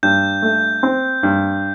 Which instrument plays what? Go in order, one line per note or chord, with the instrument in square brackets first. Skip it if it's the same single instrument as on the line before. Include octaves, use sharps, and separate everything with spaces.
[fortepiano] G2 [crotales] G6
[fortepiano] A3
C4
G2